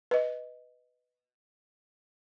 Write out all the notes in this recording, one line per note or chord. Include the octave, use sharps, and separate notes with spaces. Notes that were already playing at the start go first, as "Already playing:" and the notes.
B4 D#5